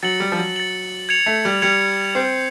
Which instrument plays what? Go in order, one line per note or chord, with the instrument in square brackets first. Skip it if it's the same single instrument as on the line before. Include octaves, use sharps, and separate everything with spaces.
[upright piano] F#3 [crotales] A6 C#7 F#7
[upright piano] G3
F3
F#3
[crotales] A6 C#7 F#7
G#6 C#7 F7
[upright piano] A3
G3
[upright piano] G3 [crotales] G#6 C#7 F7
[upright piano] C4 [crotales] G6 C7 F7